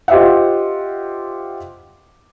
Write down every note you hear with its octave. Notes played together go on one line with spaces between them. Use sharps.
F4 G4 C5 D#5 E5 F#5